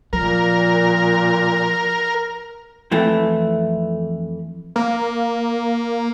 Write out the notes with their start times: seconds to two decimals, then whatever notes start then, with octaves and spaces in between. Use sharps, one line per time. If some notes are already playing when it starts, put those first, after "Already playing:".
0.13 A#2 F3 A#4
2.91 F2 E3 A3
4.76 A#3